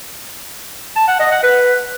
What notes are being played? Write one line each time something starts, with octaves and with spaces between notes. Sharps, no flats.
A5
F#5
D#5
F#5
B4